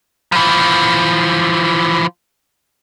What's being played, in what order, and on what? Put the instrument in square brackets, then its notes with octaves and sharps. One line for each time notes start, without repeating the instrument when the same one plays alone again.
[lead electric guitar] E3 F3